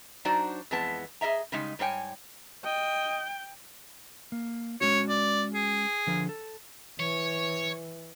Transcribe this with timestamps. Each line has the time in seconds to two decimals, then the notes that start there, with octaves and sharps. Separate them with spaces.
0.25 F#3 D4 D#4 F#4 C5 D5
0.71 F2 E3 G#3 B3 A5
1.21 G#4 A#4 D#5 E5 A#5
1.52 C#3 G3 G#3 D#4
1.79 G#2 G3 C#5 G5 G#5
2.65 D#5 G5
4.32 A#3
4.81 G#3 C#4 F#4 C#5
5.09 D5
5.54 G#4
6.07 D3 F3 A#4
6.29 A4
7.00 E3 C#5